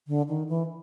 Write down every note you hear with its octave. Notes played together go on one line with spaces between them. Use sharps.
D3
D#3
E3